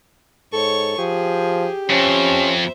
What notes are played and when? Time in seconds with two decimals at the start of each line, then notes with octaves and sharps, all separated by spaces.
0.53 G#2 A4 C#5 C#6
0.98 F3 G4 G#4
1.90 F2 C#4 C5 E5